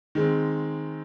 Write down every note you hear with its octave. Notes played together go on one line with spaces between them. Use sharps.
D#3 G#3 C4